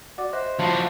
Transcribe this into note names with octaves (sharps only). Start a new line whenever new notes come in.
F#4 D5 D6
C5 D#5 E5 F#6
F3 F#4 A5 B5